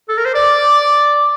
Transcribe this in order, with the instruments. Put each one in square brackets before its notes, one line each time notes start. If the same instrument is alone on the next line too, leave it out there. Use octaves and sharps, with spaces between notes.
[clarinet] A4
A#4
C5
[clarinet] D5 [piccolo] D6